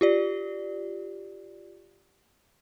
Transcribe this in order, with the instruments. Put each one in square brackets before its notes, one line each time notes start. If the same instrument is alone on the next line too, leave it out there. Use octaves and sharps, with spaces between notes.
[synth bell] F4 G4 D5